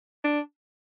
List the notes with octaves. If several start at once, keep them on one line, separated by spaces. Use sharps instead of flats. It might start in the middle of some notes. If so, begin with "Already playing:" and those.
D4